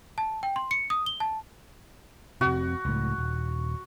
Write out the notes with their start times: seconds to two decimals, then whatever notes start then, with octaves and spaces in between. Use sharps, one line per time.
0.18 A5
0.43 G5
0.56 C6
0.71 C#7
0.90 D#6
1.06 G7
1.20 A5
2.41 F1 C3 F#4
2.85 C#2 A2
3.18 D#1